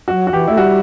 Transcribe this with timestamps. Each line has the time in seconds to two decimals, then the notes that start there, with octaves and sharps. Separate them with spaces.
0.08 F#3 F#4
0.27 F#4
0.32 E3 G4
0.47 A3 E4
0.57 G3 F#4